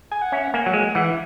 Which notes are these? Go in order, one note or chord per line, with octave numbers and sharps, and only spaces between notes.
G#5
F#5
C#4 E5
F#5
A#3 G#5
F#3 F#5
G#3 G#5
F#5
E3 F#5
E5